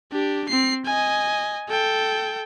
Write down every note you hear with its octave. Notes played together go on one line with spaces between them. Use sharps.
D4 G4
C4 C7
D#5 G#5
A4 G5